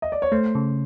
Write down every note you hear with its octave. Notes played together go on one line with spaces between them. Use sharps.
D#5
D5
C#5
A3 C5
C#3